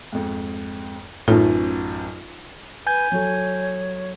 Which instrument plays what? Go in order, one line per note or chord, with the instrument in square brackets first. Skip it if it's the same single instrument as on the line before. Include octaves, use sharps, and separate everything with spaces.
[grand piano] F2 G#2
[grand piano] A1 F#2 [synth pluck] A2 [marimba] D#4 F4
[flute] B4 [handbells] G#5 G6 G#6
[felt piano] F#3 A4 [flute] C#5